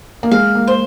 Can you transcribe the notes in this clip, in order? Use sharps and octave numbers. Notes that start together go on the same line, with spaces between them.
A#3
G#3 F5
A#3
C5